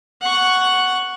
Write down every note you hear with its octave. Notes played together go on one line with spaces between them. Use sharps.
F#5 C#6